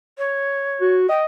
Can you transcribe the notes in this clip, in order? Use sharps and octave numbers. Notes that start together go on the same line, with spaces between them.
C#5
F#4
D#5 G5